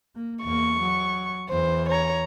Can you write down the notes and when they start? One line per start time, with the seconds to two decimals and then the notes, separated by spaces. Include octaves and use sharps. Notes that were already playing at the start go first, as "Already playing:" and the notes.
0.15 A#3
0.44 E2 A#3 C#6
0.80 F#3
1.50 E2 E3 C5
1.89 C#5 A#5